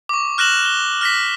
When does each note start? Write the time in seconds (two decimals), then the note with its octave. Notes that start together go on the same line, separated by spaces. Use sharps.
0.09 C#6 D6
0.38 F6 F#6 A#6 E7 F#7
0.65 G7
1.01 F6 A#6 B6